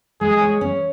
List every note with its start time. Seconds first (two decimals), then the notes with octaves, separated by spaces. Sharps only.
0.21 G#3 G#4
0.41 C#5
0.61 C#4